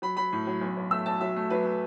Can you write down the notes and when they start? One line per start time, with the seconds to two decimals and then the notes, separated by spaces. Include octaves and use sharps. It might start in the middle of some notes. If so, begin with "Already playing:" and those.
0.02 F#3 B5
0.17 F#3 B5
0.33 A2
0.47 F#3
0.61 B1
0.77 B1
0.91 A3 E6
1.06 B1 A5
1.21 F#3 E5
1.36 A3
1.50 F#3 B4
1.65 A3